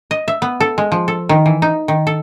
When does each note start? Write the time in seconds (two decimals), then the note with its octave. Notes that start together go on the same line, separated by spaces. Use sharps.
0.11 D#5
0.28 E5
0.42 B3
0.60 A4
0.78 G#3
0.92 F3
1.08 A4
1.29 D#3
1.46 E3
1.62 D#4
1.88 D#3
2.07 A4